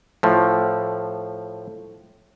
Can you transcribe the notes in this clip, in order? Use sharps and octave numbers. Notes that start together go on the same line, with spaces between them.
A2 F3